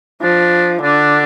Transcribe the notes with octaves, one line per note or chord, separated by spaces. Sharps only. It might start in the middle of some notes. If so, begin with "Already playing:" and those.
F3 D4
D3 D4